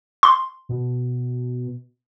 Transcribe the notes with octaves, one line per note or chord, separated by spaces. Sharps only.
C6
B2